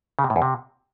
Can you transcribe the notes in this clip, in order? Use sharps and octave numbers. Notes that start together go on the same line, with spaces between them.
C#3
C3
A2
E2
C3